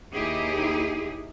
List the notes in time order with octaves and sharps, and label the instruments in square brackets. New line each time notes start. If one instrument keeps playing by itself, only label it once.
[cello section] D#2 D#4 E4 G4 G#4